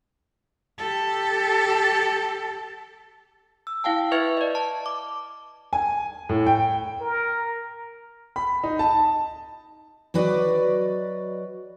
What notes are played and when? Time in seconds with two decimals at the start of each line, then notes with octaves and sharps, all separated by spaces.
0.78 G4 A4
3.67 E6
3.84 E4 F5 G5 A5
4.12 E4 B4 E5 C#6 F6 G#6
4.37 D5 D#5
4.55 A5
4.86 D6
5.73 G#5
6.29 A2
6.46 G5
7.01 A#4
8.36 B5
8.64 D#4
8.79 A5
10.14 F#3 F#4 B4 D5 D#5